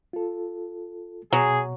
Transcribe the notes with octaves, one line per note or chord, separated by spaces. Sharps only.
F4 A4
B2 F#3 G#4